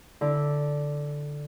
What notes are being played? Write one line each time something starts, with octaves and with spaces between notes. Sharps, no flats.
D3 E4